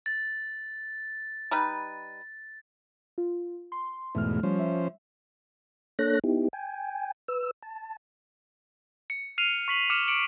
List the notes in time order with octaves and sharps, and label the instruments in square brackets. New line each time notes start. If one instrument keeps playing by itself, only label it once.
[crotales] A6
[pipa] G3 D#4 B4
[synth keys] F4
C6
[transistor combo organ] E2 G#2 B2 [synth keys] A3 F6
[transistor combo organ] F3 C#4 C5 [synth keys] G3
[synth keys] E5
[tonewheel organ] A#3 D4 A4 C#5 F#6 A#6
B3 D#4 E4 G4
G5 G#5
B4 E6
A5
[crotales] C#7
F6 C7 D#7 F7
C#6 B6 F#7
D6 F6 C#7 E7
D6 C#7 D7 F#7